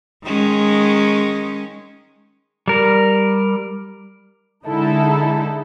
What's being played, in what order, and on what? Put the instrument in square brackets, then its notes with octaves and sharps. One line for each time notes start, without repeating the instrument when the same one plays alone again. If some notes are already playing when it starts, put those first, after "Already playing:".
[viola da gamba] D#3 G#3 C#4
[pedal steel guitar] G3 A#4
[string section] D3 G#3 D#4 E4 A4